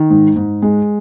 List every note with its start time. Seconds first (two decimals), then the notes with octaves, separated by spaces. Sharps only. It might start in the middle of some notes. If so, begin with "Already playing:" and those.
Already playing: D#3
0.10 G#2
0.36 G#2
0.62 G#3